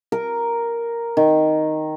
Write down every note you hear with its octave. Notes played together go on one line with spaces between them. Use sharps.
A#4
D#3